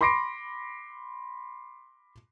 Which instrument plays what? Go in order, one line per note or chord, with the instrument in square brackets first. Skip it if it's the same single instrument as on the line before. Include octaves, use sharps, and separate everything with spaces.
[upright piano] B5 C6 D6 A#6 C7 D7